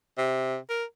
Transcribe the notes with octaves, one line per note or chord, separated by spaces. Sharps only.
C3
A#4